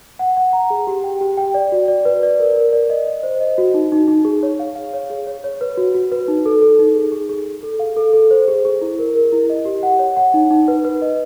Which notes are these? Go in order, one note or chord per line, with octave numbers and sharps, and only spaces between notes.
F#5
F#5
A#5
G#4
G4
G5
G4
G5
D5
F#4
D5
B4
D5
A#4
A#4
D5
D#5
D#5
C5
D#5
F#4
D#4
D#4
D#4
G#4
C#5
F5
F5
C#5
G#4
C#5
C#5
B4
F#4
F#4
B4
D#4
A4
A4
D#4
G#4
G#4
G#4
G#4
A4
F5
A4
A4
C5
G#4
G#4
E4
A#4
A#4
E4
D#5
G4
F#5
C#5
F#5
D#4
D#4
B4
B4
D#5